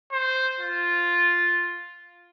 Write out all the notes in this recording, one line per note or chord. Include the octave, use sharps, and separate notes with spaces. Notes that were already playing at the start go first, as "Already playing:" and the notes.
C5
F4